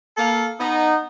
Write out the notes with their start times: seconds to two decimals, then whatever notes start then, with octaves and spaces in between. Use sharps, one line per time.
0.18 A#3 A4 F5
0.60 B3 D#4